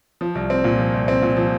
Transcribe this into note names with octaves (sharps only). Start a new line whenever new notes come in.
F3
C2
C4
A#2
F3
C2
C4
A#2
F3